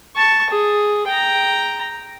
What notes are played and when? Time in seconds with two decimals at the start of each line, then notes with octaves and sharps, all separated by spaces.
0.16 A5 C#6
0.50 G#4
1.08 G5 A#5